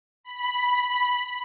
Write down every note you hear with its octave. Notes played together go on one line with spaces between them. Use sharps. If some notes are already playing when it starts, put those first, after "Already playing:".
B5